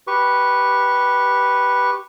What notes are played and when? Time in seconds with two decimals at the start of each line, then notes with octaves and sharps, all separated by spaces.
0.07 G4 B4 C#6